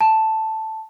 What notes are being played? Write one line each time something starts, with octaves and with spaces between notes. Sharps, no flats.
A5